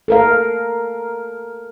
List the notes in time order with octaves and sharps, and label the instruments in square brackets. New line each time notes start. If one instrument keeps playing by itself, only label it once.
[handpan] A4 A#4 F5